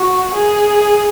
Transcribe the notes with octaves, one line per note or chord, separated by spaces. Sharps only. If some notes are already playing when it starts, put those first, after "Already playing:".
Already playing: F#4
G#4